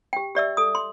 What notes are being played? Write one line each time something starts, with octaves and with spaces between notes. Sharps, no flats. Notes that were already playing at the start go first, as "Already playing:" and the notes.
G4 G5
G4 D5 E5 E6
A4 D#6
C6